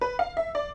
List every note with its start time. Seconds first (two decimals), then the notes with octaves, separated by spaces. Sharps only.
0.01 B4
0.19 F5
0.37 E5
0.55 D5